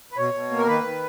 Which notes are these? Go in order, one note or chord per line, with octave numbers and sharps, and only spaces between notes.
B4
B2 C#5
B2
A#3
A#4
D#3 B4
D#3